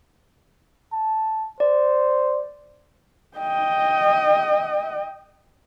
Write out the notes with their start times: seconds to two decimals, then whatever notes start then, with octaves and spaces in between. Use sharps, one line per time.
0.93 A5
1.60 C5 D5
3.37 D#5 G5